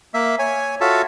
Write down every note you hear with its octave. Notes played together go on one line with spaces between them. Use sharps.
A#3 E5
C#5 G#5
F4 F#4 A4 C#5 E5 A5